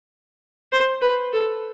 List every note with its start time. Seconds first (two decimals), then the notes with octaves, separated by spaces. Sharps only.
0.72 C5
1.02 B4
1.33 A4